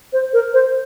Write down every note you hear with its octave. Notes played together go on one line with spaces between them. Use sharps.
C5
A#4
C5